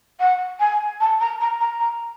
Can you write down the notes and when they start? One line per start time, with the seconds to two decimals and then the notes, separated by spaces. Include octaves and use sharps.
0.19 F#5
0.59 G#5
1.00 A5
1.20 A#5
1.40 A#5
1.60 A#5
1.79 A#5